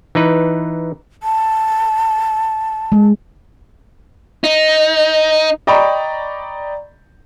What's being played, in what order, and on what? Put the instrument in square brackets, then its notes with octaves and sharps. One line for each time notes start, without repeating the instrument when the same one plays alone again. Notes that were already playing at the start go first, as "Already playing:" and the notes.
[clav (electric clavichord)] E3 D#4 B4
[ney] A5
[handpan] G#3
[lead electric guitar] D#4
[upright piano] D5 D#5 G5 A#5 B5 C#6